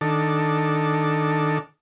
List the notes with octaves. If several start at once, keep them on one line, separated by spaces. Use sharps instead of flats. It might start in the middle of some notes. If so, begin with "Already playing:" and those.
D#3 D4 A4